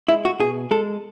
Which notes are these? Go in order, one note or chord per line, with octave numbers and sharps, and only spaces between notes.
G#3 E4
F#4
B2 G#4
G#3 A4